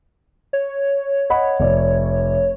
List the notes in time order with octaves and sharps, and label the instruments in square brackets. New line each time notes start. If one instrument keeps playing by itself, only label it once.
[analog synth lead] C#5
[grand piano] D#5 F#5 B5
F1 D5